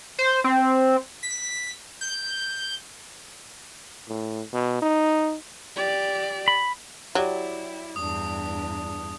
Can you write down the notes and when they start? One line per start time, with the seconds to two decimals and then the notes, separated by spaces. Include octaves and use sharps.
0.19 C5
0.44 C4
1.23 B6
2.01 G6
4.09 A2
4.53 B2
4.82 D#4
5.76 G4 D5
6.48 B5
7.15 F#3 E4 G4 D5
7.96 E2 G2 D4 D#6